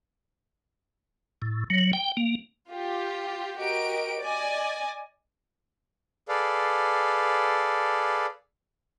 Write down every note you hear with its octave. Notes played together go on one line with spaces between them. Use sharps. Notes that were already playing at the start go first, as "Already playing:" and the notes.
A2
F#3
G5
A#3
F4 G4
F#4 G4 A#4 D#5 D7
D5 D#5 G#5
G#4 A4 B4 D5 F5